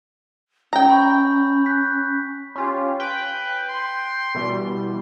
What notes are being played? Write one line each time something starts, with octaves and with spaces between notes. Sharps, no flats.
C#4 G5 A#5
B5 C#6 G6
F#6 G6 B6
C#4 F4 G4
B4 G5
C6
B2 E3 G3